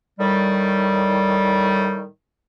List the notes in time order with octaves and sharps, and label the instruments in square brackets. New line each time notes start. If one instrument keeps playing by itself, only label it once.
[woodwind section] A2 D#3 G3